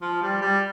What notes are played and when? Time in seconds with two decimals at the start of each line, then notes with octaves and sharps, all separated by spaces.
0.02 F3
0.22 G3
0.42 G3